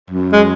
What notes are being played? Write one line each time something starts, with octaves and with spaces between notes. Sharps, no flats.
F#2
G#3